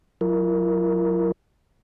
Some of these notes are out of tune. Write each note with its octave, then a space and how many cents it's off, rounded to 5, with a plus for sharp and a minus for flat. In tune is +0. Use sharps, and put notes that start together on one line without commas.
F#3 -25 E4 +45 A#4 +0